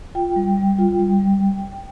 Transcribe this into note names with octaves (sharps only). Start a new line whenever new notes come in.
F4 G5
G3
G3
F4
G3
G3